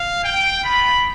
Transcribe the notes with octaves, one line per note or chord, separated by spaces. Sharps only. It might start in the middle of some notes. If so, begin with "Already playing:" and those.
Already playing: F5
G5
B3 F4 B5